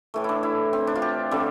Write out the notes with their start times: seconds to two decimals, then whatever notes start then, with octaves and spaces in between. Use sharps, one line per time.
0.14 A2 E3 A3
0.24 D4 E4
0.43 E4
0.73 C4
0.87 D4
0.95 F4
1.02 G4
1.31 D3 G3 C4